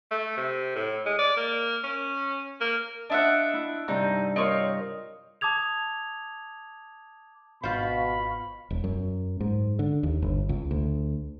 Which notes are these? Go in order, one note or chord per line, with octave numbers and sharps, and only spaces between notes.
A3
C3
A2
G#3
D5
A#3
C#4
A#3
D4 F4 D#5 E5 F#5
E4
G2 C3 D#4
C4 F4 A#4 C#5 D#5
A5 D6 D#6 G#6 F7
G#1 B2 F4 C5 F5 B5 C#6
E1
F#2
G#2
D3
D#2
G1
C#2
D2